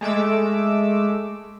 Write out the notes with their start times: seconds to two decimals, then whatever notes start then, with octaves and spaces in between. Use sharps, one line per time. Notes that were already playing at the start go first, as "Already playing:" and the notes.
0.01 G#3 A3 D6 E6